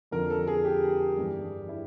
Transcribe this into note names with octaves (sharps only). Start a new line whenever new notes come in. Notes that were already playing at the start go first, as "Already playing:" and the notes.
F2 D3 F3 A#4
A4
G#4
G4
G2 E3 G3
E4